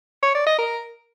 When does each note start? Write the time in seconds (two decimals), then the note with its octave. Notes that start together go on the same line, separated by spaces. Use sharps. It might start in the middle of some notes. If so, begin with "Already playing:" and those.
0.23 C#5
0.35 D5
0.46 D#5
0.58 A#4